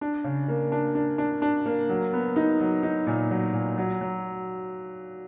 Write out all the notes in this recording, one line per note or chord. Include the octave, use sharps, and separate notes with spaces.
D4
C#3
A#3
D4
D4
D4
D4
A#3
F#3
B3
D#4
F#3
D#4
A#2
F#3
A#2
F#3
F#3